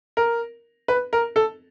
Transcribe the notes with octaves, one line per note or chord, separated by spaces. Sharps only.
A#4
B4
A#4
A4